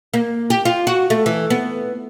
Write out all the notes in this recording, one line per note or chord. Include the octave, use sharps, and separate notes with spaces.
A#3
G4
F4
F#4
A3
E3
B3